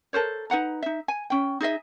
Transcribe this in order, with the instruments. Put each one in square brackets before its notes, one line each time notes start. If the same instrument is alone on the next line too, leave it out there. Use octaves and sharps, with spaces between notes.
[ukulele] A4 A#4 C5 C#5
D#4 B4 F#5 A#5
D#4 E5
G#5
C#4 G5
D#4 G#4 D#5 E5